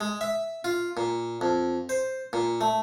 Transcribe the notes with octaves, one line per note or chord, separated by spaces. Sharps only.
G#3
E5
F4
A#2
F2
C5
A#2
A3